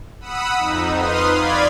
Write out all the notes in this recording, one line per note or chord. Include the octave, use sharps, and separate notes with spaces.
F#5 B5 D#6 E6
F2 D#4
B4 C6 D#6 F6
D5 F5 B5 G#6